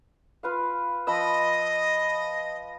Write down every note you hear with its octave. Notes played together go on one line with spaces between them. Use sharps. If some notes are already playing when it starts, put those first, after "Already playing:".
F4 B4 F5
F3 D#5 B5 E6